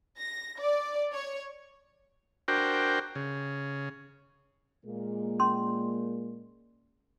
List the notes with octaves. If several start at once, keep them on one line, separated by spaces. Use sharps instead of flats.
A#6
D5
C#5
D4 F#4 A#4 C5 G5
C#3
A#2 G#3 A#3
C#4 C6